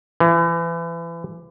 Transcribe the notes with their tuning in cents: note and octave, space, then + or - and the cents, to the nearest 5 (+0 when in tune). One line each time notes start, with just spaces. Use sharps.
E3 +30